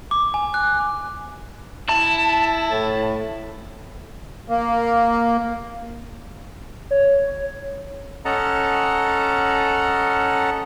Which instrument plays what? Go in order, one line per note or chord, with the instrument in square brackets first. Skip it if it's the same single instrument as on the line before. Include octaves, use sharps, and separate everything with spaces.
[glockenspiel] D6
G#5
F#6
[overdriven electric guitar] E4 [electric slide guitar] A5
[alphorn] A2
[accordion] A#3
[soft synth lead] C#5
[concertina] C#4 A4 D#5 F#5 A5 A#5